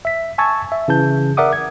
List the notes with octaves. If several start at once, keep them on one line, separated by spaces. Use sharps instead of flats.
E5 B6
G#5 A5 C#6 E6 G#6 A6
E5
C#3 E3 A5 G6
A#4 D5 E5 F#5 D6 D#6
G#6